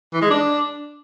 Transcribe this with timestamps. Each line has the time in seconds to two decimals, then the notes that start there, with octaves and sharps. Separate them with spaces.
0.13 E3
0.22 G#3
0.30 D4